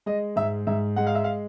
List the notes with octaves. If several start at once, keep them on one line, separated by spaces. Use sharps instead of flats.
G#3 D#5
G#2 E5
G#2 E5
G#3 F#5
F5
E5
F5